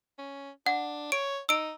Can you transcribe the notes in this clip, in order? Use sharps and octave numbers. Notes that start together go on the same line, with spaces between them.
C#4
D4 F#5
C#5 D7
D#4 E6 D7